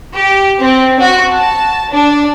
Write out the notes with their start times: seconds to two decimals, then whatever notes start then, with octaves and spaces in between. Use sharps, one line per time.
0.13 G4
0.61 C4
1.00 F#4
1.34 A5
1.92 D4